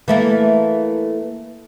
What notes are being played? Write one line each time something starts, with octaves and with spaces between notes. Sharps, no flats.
E3 A3 A#3